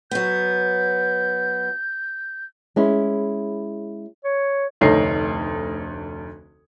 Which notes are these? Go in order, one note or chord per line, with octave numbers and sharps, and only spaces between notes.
F#3 B3 G6
G#3 C#4 E4
C#5
F1 D2 D#4 C#5 C7